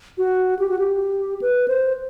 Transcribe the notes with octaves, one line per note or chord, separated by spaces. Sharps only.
F#4
G4
F#4
G4
B4
C5